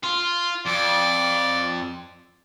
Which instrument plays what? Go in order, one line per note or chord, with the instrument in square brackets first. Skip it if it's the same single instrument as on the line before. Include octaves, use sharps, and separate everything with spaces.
[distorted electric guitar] F4
[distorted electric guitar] F2 [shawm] D5